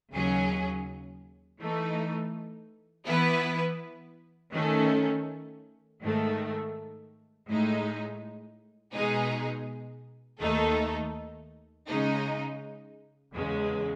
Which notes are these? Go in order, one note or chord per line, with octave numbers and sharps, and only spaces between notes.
D#2 C#3 F#3 C#4 G#4
E3 A3 D#4
E3 B3 E4 B4
D#3 A3 C#4
G#2 D#3 A3
A2 G#3 D#4
B2 G#3 D#4 G#4
D#2 D#3 A3 D#4 A4
C#3 G#3 D#4
E2 C#3 G#3